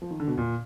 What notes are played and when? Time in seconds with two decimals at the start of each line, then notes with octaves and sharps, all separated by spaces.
0.02 F3
0.11 D#3
0.20 D3
0.28 B2
0.38 A#2